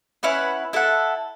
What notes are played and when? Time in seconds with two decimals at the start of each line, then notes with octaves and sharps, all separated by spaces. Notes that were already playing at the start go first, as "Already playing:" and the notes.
0.23 C#4 E4 B4 F#5
0.73 E4 A4 F#5